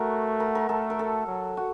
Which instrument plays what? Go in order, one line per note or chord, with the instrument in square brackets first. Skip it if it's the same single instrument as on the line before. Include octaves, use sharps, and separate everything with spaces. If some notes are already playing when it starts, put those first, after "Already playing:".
Already playing: [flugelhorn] A3 [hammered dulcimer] F#4 A#4
[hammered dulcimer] A#4
A#4
[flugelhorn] A3 [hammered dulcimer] A4
[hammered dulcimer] A#4
A4
[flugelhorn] F#3
[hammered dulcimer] F#4